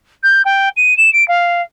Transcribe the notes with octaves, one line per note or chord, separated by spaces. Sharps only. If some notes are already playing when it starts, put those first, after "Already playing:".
G6
G5
D#7
E7
D7
F5